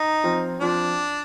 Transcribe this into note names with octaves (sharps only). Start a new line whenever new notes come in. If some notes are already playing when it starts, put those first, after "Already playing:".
Already playing: D#4
F3 C4 F4
F3 C4 D4 F4